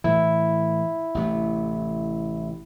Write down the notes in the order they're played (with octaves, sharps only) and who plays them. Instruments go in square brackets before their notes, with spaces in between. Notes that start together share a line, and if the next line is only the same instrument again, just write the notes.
[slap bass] A2 E3 [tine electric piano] E4
[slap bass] A1 C3 A3